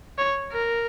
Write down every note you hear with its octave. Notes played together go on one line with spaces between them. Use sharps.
C#5
A#4